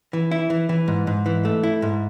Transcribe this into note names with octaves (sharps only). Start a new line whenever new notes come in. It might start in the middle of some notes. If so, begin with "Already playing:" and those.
E3
E4
E3
E3
G#2
G#2
E3
A3
E4
G#2